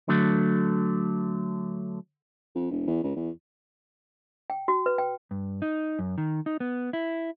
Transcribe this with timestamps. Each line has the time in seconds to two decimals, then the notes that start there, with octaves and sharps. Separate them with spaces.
0.08 D3 F#3 A3
2.55 F2
2.71 E1
2.87 E2
3.04 C#2
3.16 E2
4.50 G5
4.68 F#4
4.86 B4
4.98 G5
5.31 G2
5.62 D#4
5.99 F#2
6.18 D#3
6.46 D#4
6.60 B3
6.93 E4